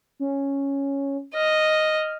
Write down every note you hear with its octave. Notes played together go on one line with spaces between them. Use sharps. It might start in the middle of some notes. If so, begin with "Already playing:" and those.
C#4
D#5 F6